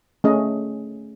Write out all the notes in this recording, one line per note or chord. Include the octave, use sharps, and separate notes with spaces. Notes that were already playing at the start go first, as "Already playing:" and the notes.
A3 C#4 G#4 D#5